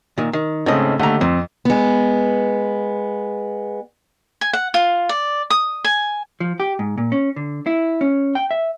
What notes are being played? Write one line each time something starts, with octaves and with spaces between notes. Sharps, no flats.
A#2 D#3
D#3
G#2 C#3 A3 C4 D#5
D#2 D3 A3 A#5
F2 C4
G#3 B3
G#5
F#5
F4
D5
D#6
G#5
F3
G4
G#2
A#2
C#4
D3
E4
C#4
G5
E5